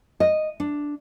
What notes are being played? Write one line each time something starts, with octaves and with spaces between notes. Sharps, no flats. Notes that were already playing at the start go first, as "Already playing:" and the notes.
D#5
D4